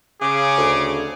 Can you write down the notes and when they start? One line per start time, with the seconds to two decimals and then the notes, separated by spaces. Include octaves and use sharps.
0.21 C#3 G#4 D6
0.58 D2